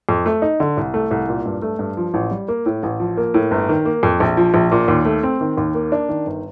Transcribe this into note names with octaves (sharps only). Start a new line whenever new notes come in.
F2
A3
D#4
D3
C2
A3
C2
A#2
G2
A3
G2
F3
A1
G3
A#3
A2
A1
F3
A#3
A2
G1
D#3
A#3
F2
A#1
F3
A#1
A#2
D#2
A3
C4
D#3
D#2
A#3
D4
D#3
G1